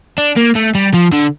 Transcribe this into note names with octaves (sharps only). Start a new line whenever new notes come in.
D4
A#3
A3
G3
F3
D3